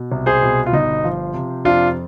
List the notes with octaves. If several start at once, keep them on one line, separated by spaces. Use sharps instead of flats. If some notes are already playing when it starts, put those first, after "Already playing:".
Already playing: B2
C2
G#4 C5
B2
F4
G1 D#4
F3
C3
F2 D4 F4